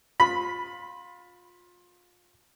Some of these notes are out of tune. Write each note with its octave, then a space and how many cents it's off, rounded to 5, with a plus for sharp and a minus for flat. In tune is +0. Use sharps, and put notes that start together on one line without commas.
F4 +25 B5 +0